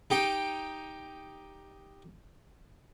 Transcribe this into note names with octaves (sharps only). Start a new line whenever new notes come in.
D#4 G4 G5